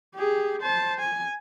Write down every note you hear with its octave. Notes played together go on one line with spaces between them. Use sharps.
G4 G#4
C5 A5
G#5